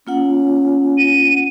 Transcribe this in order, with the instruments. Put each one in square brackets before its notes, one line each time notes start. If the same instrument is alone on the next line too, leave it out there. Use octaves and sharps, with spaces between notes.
[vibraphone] A#3 F4 F#5 [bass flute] C#4
[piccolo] D#7